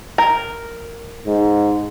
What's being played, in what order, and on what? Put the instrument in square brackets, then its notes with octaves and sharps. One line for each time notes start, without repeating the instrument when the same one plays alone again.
[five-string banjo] A#4
[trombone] G#2